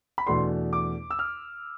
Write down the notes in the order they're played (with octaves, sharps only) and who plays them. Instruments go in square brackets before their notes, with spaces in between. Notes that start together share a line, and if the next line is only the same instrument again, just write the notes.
[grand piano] B5
E2 B2 A3 D4 C6
D6
E6
F6